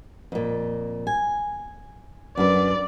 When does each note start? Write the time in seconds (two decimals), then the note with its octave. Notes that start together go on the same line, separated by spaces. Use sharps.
0.32 F2 A#2
1.07 G#5
2.37 F#2 D4 B4 D5